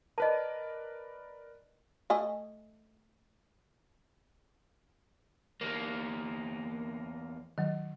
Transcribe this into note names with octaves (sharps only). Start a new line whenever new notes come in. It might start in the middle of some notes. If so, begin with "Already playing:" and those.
A#4 B4 D5 D#5 A5
A3 D#5 G#5
E2 A#3
D#3 F#3